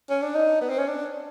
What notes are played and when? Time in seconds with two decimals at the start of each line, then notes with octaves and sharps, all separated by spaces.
0.10 C#4
0.22 D4
0.35 D#4
0.61 B3
0.69 C4
0.79 C#4
0.87 D4